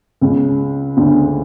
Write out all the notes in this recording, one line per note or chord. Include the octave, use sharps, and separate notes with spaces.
C#2 C#3
D2 D3